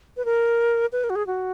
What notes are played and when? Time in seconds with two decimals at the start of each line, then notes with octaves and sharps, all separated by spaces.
0.17 B4
0.25 A#4
0.93 B4
1.04 A#4
1.10 F#4
1.16 G#4
1.27 F#4